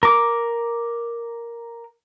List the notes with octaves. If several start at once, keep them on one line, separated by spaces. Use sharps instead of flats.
A#4 D6